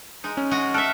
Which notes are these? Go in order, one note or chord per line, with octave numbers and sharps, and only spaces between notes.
G#3 D#4
C#4
G#3 F#4 D#5
A4 E5 F6 F#6 D7